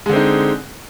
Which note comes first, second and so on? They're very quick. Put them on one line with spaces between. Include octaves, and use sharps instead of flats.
G#3 D3 C4 D#4